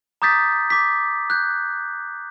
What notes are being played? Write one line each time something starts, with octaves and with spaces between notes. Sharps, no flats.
A#5 D6 D#6 G6 A6 B6
D6 B6
F#6 G6